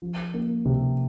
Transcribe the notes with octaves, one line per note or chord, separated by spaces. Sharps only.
F3
A#3
C3